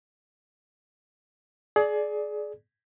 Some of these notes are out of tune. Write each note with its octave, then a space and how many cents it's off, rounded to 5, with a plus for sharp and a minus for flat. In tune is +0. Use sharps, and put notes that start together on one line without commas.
G#4 +25 D5 +0